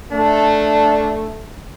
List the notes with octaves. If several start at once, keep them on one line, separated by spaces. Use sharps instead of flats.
A3 D4